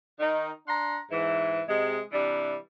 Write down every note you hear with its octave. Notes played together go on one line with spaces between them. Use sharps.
D#3 D#4
D4 F#5 A#5 C6
G#2 E3
C3 G#3
C3 E3 G3 D4